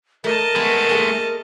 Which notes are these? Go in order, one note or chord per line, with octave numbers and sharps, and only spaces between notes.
A3 A#4 D#5 A5
G#3 A3 B3 G#5
A#3 G#4 A4